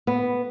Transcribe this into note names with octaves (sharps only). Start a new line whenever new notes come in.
B3